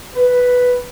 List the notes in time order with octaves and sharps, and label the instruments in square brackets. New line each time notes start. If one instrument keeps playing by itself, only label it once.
[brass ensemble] B4